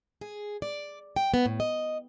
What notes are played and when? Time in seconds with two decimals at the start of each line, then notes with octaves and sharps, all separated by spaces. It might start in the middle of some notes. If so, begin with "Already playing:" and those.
0.21 G#4
0.62 D5
1.16 G5
1.34 B3
1.46 A2
1.60 D#5